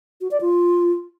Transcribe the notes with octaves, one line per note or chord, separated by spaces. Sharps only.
F#4
D5
F4